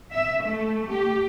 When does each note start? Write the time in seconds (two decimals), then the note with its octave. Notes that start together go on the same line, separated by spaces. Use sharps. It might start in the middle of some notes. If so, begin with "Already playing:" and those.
0.13 E5
0.45 A3
0.91 G4